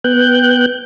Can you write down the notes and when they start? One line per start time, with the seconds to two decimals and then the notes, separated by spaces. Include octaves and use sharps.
0.04 B3 G5 F#6 G6